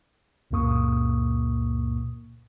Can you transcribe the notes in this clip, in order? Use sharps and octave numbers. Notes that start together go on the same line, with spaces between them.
C#2 F#2 A#2 A#3 C#6 D#6